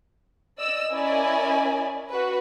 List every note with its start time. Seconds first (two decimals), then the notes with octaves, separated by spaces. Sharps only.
0.59 D5 D#5 E6
0.91 C#4 E4 A#4 D5 D#5 G#5
2.10 F#4 B4